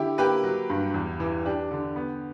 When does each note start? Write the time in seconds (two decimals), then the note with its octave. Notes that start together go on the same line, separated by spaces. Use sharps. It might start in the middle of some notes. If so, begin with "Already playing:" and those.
Already playing: D3 E4 G4
0.18 A#3 G4 B4
0.44 F#3
0.70 G2
0.94 E2
1.20 E3
1.46 D4 G4
1.71 D3
1.96 B3